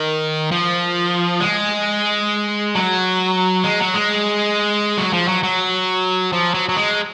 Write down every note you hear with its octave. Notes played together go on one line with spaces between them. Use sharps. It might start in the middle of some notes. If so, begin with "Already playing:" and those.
Already playing: D#3
F3
G#3
F#3
G#3
F#3
G#3
F#3
F3
F#3
F#3
F3
F#3
F#3
G#3